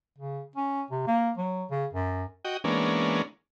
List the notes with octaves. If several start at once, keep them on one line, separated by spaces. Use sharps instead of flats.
C#3
C#4
C3
A#3
F#3
C#3
F#2
F#4 D#5 G5
E3 G#3 A#3 B3 C#4 D4